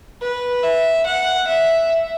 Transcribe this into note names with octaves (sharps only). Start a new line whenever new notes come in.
B4
E5
F#5
E5